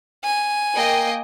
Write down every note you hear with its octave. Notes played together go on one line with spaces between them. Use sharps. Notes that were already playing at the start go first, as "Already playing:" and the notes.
G#5
A#3 D#5 G5